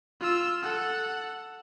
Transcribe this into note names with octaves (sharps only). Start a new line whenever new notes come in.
F4 E6
A4 F#5